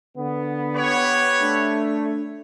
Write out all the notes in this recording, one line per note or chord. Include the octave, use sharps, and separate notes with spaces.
D3 B3
G4 B4 C#5
A3 D4